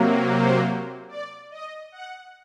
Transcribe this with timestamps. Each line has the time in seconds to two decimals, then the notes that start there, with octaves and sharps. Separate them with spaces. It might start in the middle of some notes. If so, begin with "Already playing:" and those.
Already playing: C3 F#3 A#3
0.26 C5
1.09 D5
1.51 D#5
1.92 F#5